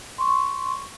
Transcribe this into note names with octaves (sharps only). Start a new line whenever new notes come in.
C6 C#6